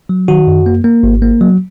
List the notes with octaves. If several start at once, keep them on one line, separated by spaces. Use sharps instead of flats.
F#3
D#3 F#4
F#2
A#3
A#3
G#1
A#3
F#3